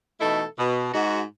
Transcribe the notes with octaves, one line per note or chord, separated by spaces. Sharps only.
B2 E3 A3 D#4 E4 A4
B2
G#2 G#3 F#4